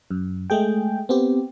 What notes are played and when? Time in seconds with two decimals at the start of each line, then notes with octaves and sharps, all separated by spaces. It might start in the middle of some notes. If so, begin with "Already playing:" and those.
0.11 F#2
0.50 G#3 A3 G#4 G5
1.09 B3 C4 G4